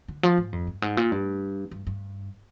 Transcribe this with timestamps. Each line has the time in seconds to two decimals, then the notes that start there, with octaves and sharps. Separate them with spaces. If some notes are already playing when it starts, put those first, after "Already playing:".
0.08 D3
0.23 F3
0.38 G#2
0.53 F2
0.67 G2
0.82 G#2
0.97 A#2
1.12 G2
1.71 G2
1.87 G2